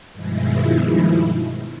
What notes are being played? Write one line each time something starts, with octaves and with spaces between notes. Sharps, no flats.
G2 B2 D#3 F3 G#3 E4